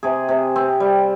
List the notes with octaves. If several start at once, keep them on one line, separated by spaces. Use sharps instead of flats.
C3 G#4
C3
C4
G3